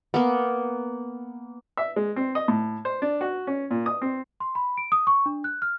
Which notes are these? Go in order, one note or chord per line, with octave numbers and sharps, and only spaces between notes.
A#3 B3
E5
G#3
C4
D#5
A2
C5
D4
F#4
C#4
A#2
D#6
C4
C6
B5
D7
D#6
C#6
D4
F#6
F6